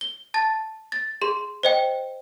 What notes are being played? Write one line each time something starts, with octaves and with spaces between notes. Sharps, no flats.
G7
A5 A6
A6
G#4 C6
C5 D#5 G5